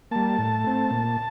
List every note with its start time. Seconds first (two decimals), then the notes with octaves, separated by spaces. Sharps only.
0.11 G3 A#3 A5
0.38 A2
0.64 A3 C4
0.90 A#2